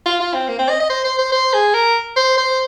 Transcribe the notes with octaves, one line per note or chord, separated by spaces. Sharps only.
F4
F4
C4
A#3
C4
D#5
D#5
C5
C5
C5
C5
G#4
A#4
C5
C5